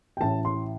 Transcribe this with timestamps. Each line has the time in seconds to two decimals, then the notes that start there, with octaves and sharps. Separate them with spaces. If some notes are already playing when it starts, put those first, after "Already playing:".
0.17 G5
0.21 A1 A2 A5
0.45 C6